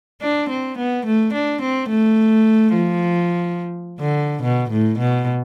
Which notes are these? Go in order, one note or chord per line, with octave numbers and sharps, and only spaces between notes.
D4
C4
B3
A3
D4
C4
A3
F3
D3
B2
A2
B2